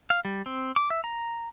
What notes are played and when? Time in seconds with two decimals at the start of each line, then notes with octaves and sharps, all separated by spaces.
0.10 F5
0.25 G3
0.46 C4
0.76 D6
0.90 E5
1.04 A#5